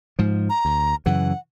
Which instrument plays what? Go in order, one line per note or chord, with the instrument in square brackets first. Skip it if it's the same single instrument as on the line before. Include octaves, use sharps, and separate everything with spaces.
[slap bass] G#2 F3
[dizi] A#5
[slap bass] D2
[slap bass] F#2 C#3 E3 [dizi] F#5